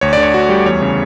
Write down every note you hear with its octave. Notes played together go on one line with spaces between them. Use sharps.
D2 C#5
D5
D3
C#5
D2 F#4
G3 G4
E2 C#5
C#3